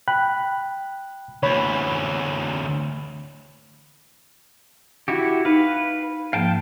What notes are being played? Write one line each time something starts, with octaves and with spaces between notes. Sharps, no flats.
G5 B5 F#6
D2 E3 C#5 B5
E4 F#4 G4
D#4 B4 F5
G#2 F3 A#3 F5 G5 A5